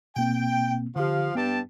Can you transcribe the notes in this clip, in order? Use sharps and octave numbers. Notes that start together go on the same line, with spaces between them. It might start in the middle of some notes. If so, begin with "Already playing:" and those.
B2 A#3 C4 G5
D3 F3 G4 F5
G2 B3 G5 A5